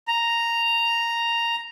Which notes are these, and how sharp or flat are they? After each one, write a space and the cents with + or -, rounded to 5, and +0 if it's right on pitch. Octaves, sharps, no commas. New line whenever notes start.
A#5 -5